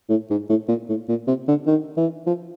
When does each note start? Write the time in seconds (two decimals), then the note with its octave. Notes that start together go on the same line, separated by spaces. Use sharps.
0.09 A2
0.30 G#2
0.49 A2
0.68 A#2
0.89 A2
1.09 A#2
1.27 C3
1.48 D3
1.66 D#3
1.97 E3
2.26 F3